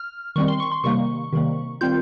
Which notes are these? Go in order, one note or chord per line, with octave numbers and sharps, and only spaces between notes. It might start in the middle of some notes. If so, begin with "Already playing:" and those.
Already playing: F6
D#3 G3 C4 C#6
C6
C#6
C6
C3 D#3 G3 A#3 C#6
C3 D#3 G3 A#3
D#3 G3 C4 F4 G6